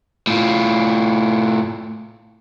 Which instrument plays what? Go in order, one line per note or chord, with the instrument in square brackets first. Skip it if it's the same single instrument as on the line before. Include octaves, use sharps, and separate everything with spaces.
[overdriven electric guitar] A2 F4